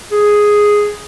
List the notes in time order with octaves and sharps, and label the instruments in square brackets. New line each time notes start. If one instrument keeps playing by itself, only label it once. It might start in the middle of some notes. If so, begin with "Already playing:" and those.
[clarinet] G#4